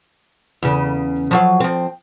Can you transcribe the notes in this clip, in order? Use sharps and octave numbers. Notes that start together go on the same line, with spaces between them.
E2 C#3
F3 F#3 F5
F3 C4